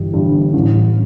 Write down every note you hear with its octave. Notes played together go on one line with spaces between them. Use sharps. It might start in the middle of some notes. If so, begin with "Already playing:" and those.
Already playing: G1 G2 E3 G3
G1 G2 E3 G3
A1 G2 E3